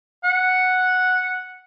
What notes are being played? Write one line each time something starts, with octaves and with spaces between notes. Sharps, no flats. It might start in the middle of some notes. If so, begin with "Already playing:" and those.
F#5